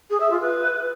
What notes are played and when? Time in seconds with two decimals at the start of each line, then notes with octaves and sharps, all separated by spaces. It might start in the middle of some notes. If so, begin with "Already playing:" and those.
0.10 G#4
0.20 E5
0.30 F4
0.41 B4